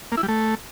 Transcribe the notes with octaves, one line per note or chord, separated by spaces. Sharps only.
A#3
E4
G3
A3